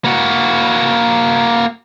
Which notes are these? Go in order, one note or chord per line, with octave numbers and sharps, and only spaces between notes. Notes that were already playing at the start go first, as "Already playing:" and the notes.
A#3 F#4